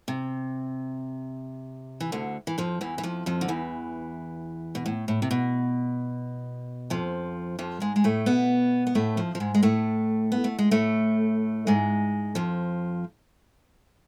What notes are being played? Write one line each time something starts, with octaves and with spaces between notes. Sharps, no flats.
C3
E3
D2 D3
E3
F2 F3
E2 E3
E3
F2 F3
F2 F3
D3
E2 E3
B2
A2
A2
C3
B2
F2 F3
F2 F3
G#2 G#3
G#3
A2 A3
B2 B3
B3
A2 A3
F2 F3
F3
G#2 G#3
G#3
A2 A3
B3
A3
G#3
A2 A3
G#2 G#3
F2 F3